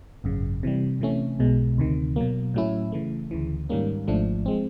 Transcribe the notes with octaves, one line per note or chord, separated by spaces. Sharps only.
G#1 F#2 C#3
C3 E3 G3
C3 E3 A3 C#4
B1 B2 G#3
D2 C3 D#3
B2 F#3 A#3
A2 F#3 A3 C#4 E4
C#3 E3 A3
D2 C#3 E3
G#2 D#3 G3 A#3 C#4
G#1 G#2 F3 A3 D4
F3 G#3 C4